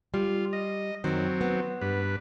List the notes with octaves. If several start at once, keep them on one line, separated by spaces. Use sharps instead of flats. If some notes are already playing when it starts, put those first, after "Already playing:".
G3 F4
D#5
F#2 D#3 F#3 C4
B3
G2 B4